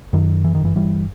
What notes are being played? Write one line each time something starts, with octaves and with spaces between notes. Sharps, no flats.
F#2 D#3 F#3
E3
D#3
G1 E3
E3 G3